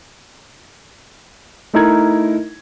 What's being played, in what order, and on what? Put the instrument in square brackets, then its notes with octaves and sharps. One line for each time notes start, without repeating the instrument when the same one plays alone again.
[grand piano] A3 D#4 E4 A#4 A#5 G#6